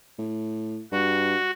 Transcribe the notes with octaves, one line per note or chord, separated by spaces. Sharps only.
A2
G2 F#4